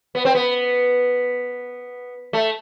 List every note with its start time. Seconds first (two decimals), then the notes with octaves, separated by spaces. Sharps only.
0.15 B3
0.25 C4
0.35 B3
2.33 A3